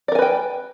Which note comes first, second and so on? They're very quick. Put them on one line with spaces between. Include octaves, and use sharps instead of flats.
D5 A#4 G#5 B4 G5